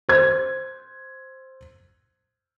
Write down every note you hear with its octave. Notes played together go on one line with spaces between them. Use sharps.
C5 G#6